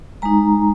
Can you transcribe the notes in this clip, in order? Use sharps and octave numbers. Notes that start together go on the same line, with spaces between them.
G#3 D#4 A#5